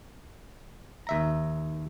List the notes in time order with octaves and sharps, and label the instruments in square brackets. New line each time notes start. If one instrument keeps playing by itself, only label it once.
[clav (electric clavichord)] D#2 E5 A#5